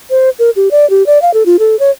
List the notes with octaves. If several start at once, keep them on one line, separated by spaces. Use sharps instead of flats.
C5
A#4
G4
D5
G4
D5
F5
A4
F4
A4
C#5